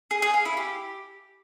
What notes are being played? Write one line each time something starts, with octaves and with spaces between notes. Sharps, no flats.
G#4
G#4
F5
E4
G4